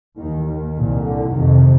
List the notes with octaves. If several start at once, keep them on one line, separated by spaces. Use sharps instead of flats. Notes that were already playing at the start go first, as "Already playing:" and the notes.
D#2 D#3
D#3
C2 A#2
D3
F2 C3 D#3